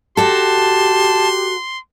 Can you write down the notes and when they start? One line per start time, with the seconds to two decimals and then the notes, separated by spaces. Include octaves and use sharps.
0.17 F#4 G4 A4 A5 C6